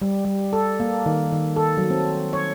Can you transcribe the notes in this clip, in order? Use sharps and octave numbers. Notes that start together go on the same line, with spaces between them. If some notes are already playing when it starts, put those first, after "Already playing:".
G3
G3
A4
A#3
D#3
D#3
A4
F#3
C4
C#5